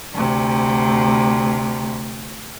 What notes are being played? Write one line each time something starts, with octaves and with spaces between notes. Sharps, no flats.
D2 C3